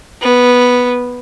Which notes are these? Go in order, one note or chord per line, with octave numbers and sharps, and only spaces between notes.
B3